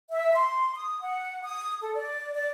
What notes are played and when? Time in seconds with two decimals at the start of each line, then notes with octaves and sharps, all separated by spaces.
0.10 E5
0.34 C6
0.74 D#6
1.01 F#5
1.43 D#6
1.81 A4
1.94 D5
2.33 D5